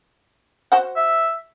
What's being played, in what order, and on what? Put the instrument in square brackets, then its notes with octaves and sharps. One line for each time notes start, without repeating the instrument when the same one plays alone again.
[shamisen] F#4 C5 F#5
[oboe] E5